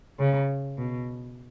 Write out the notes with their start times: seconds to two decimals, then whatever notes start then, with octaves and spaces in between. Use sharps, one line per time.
0.19 C#3
0.78 B2